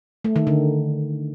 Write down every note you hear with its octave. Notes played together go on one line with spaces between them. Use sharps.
A3
D#3
D3